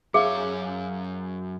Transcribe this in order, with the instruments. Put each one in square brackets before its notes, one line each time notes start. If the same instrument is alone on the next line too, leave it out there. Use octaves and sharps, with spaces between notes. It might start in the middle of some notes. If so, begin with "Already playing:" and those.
[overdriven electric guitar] F#2 C#5 [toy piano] G#4 [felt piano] E5 F5